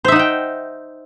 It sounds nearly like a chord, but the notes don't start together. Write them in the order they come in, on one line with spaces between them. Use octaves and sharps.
C5 E5 D#4 F#5 G5